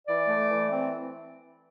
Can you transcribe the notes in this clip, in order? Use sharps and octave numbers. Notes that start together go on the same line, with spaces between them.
E3 D5
A3
E3
C4